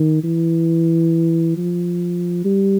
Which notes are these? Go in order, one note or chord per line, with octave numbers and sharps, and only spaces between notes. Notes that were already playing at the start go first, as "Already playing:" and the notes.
Already playing: D#3
E3
F3
G3